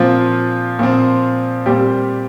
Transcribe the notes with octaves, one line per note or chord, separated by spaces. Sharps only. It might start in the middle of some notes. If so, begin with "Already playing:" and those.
Already playing: A#2 F3 C4 F4
A#2 F3 C4
A#2 G3 C4 G4